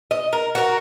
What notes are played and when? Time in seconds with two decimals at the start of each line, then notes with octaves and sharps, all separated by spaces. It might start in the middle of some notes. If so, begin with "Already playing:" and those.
0.11 D#5
0.33 A#4
0.55 F#4 A#4